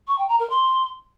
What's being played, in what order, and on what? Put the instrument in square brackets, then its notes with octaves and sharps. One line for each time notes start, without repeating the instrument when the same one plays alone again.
[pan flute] C#6
G5
A#5
A#4
C6